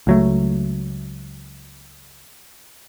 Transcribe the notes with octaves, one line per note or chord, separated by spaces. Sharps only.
C#2 F#3 A3